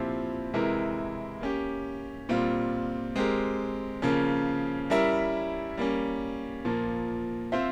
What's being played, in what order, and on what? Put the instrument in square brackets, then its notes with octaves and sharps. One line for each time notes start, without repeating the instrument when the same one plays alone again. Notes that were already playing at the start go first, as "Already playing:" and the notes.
Already playing: [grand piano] A#2 F3 C4 E4 G4
C3 E3 G#3 E4 A#4
A#3 C#4 G4
A#2 G3 C4 F4
G#3 C4 G4 A#4
C#3 F3 A#3 C#4
G3 C#4 E4 A#4 E5
G3 A#3 C#4
A#2 F3 A#3
C4 F4 C5 E5